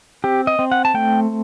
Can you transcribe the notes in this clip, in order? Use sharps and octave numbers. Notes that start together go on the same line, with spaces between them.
C4 G4
D#5
C4
F#5
A5
A3 G5